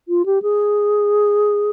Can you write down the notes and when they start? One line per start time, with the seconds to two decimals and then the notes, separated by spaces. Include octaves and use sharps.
0.08 F4
0.26 G4
0.42 G#4